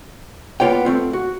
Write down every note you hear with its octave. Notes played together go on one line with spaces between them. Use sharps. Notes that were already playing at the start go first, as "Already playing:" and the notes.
A#3 B3 F4 C#5 G5
A3 C4 F4
F#4